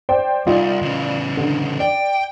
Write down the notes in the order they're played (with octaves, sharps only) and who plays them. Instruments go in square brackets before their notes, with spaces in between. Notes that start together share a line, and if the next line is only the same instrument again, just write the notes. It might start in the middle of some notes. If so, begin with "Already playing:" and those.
[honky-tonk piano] C5 D5 G5
[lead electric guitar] C2 [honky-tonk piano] D#4 F4 D5
[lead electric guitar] C#3 E3
[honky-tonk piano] D3
[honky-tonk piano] D5 [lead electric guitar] G5